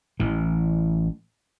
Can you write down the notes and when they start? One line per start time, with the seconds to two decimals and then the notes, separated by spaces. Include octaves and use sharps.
0.20 A1 E3